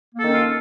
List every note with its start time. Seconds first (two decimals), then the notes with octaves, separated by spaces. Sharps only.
0.15 A#3
0.19 A4
0.24 D#3
0.28 C#4
0.32 F4